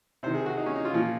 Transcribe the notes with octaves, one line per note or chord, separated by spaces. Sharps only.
C3 D#3 C5
G#4
F#4
D#4
C#4
D#4
F4
A#2 F3